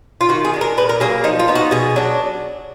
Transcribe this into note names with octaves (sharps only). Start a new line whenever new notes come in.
F4
D#3 F#4
G#4
G#3 D4
A#4
A#2 B4
A#4
F#3 A#3 G#4
F3 D#4
F4
B3 D#4
F#4
B2 G#4
F#3 D4